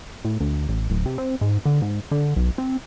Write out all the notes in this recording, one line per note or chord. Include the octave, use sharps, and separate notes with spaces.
A2
D2
A1
D1
C3
C4
G#2
D3
G#2
D3
B1
C4